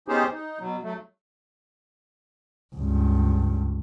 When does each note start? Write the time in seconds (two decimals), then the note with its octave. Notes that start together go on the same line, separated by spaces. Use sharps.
0.08 B3 C#4 D#4 G4 G#4 C5
0.33 D#4
0.60 B2 F#3
0.83 F#3 A3
2.75 C#2 G2